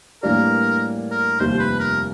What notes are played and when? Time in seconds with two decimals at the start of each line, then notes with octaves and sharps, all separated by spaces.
0.23 A2 E3 G3 A#3 D4 A#4
1.11 A#4
1.40 F1 D#2 D#3 G3 C5
1.60 B4
1.80 A#4